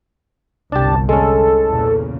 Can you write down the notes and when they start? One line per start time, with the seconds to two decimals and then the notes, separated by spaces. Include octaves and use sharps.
0.72 G1 C2 D4 G4 A5
1.09 G#3 C#4 A4
1.69 E2 A#2 C#3